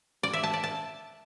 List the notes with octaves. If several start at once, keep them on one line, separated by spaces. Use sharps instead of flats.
D5
E5
A5
D5
A5